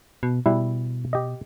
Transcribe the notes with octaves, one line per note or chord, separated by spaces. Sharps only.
B2
B2 G3 E4
G4 D#5